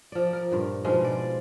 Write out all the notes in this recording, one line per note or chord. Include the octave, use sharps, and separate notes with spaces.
F3 D5
A#4
G2 A#2
G#2 B2 F3 G#3
D5